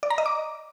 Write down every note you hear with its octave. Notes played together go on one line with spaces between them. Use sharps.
D5
A#5
D#5
D6